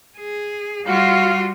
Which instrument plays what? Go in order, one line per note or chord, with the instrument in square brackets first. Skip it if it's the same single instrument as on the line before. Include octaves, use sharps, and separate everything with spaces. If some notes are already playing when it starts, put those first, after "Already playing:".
[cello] G#4
[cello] G3 F4 [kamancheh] F#4 [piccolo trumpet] F5